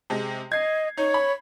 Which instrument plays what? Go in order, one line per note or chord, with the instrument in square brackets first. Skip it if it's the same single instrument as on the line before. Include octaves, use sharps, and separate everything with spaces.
[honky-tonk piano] C3 G#3
[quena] D#5 [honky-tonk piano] G#6 C7
[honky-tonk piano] D#4 [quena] C#5
[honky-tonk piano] B5